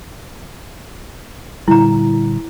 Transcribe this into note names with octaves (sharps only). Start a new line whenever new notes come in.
A#2 D3 G3 E4 A#5